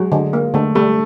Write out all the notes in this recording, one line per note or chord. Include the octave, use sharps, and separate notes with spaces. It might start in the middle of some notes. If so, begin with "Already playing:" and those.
Already playing: F#3 G#3
D3
A#3
D3 A3
G3 A3